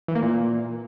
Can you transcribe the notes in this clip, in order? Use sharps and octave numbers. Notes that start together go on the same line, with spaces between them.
E3
A#3
A#2